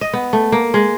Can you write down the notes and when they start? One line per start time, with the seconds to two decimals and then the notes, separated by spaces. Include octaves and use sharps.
0.01 D#5
0.13 B3
0.33 A3
0.52 A#3
0.74 G#3